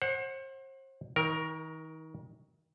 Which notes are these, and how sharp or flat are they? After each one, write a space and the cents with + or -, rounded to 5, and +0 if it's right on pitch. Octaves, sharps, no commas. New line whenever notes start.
C5 +40 F#5 +0
D#3 +35 A#4 +5